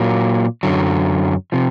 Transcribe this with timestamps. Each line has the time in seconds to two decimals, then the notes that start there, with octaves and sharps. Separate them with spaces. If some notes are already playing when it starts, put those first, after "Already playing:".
Already playing: A#2 F#3 A#3
0.63 F#2 D3 F#3
1.52 C3 F3